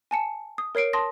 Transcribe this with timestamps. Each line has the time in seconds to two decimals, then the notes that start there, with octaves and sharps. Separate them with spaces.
0.11 G#5 A5 C#7
0.58 D#6
0.75 A#4 C#5 C7 D7
0.93 A5 C6 D#6 A#6